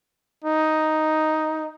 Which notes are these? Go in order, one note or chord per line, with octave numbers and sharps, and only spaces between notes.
D#4